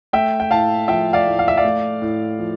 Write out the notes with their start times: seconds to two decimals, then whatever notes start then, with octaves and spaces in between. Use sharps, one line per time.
0.13 A3 E5 G5
0.40 G5
0.51 A2 F5 A5
0.88 F3 E5 G5
1.13 D5 F5
1.27 A2
1.39 F5
1.48 E5
1.57 D5 F5
1.64 A3
2.02 A2
2.39 F3